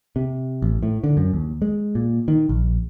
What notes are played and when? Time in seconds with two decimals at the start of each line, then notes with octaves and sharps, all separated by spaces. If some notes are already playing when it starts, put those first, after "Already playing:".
0.16 C3
0.62 A1
0.83 A2
1.04 D3
1.17 F#2
1.34 D#2
1.62 G#3
1.95 A#2
2.28 D#3
2.49 A#1